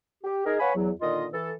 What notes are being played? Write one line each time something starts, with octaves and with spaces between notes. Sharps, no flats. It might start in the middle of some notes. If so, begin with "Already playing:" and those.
G4
D#4 G#4 A#4
B4 C#5 F5 F#5 G#5 B5
E2 F#3
A#2 D3 D#3 F4 D#5
E3 A4